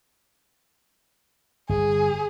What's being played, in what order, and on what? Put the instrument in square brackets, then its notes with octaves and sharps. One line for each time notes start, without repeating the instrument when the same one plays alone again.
[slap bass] G1 [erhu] G#4